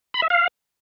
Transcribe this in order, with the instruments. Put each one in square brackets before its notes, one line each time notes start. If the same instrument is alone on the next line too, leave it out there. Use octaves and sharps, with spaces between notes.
[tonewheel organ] B5
E5
F5